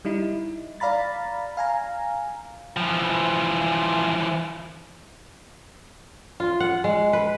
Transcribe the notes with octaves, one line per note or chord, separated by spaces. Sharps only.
G3 D#4 E4
D5 F5 A#5 B5 A6
F5 G#5 A#5
E3 F3
F4
F#5
G#3
B4